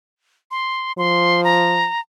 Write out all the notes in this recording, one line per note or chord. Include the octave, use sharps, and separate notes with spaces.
C6
F3 C6
A#5